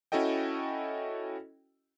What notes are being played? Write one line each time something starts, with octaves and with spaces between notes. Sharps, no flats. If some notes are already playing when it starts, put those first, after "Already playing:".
C#4 E4 F#4 A4 D#5 G5